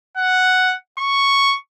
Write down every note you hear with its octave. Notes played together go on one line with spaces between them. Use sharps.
F#5
C#6